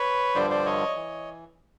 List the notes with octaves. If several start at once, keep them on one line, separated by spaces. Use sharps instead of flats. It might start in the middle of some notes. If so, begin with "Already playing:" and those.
Already playing: B4 C#5
G2 D3 F3 C5 D5
C5 D5
C#5 D#5
E3